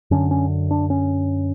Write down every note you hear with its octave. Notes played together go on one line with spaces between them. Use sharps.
F#2 D3 C#4
C#4
D4
C#4